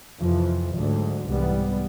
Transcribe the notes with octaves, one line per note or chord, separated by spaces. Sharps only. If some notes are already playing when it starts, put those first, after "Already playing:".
F2 C3 E3 F3
D2 G#2 D3 F#3
C2 G#2 E3 G3 B3